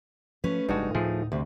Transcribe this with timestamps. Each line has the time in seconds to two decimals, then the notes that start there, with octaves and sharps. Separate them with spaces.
0.44 F3 A3 C#4 B4
0.69 F1 G2 G3 G#3 D4 D#4 F#4
0.95 D2 A2 F3 A3 G#4
1.32 D2 C3